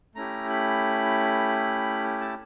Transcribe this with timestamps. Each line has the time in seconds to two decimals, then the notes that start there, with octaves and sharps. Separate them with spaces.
0.15 A3 C#4 E4 G4 A#5
0.50 B5
2.20 A5